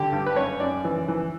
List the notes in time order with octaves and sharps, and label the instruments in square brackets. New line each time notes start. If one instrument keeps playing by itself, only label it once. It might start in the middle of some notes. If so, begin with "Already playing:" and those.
Already playing: [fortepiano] D3 G4
G2
B4
F#2 C#5
F#2 D5
E3
E3